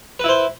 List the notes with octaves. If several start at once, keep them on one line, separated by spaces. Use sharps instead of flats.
E4 B4 C5